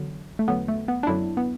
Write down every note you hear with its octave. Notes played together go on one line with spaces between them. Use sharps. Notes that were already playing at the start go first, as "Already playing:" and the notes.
Already playing: E2 D3 F#3
A3
E2 D3 F#3 B3
A3
B3
D4
F#2 D3 F#3 E4
B3